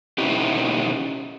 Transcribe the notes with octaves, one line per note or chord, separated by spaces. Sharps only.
B2 C#4 D#4 E4 G4